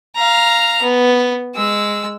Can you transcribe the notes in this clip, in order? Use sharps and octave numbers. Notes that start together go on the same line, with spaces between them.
F5 A#5
B3
G#3 E6